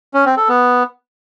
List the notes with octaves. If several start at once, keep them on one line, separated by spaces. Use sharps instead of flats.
C#4
C4
A4
B3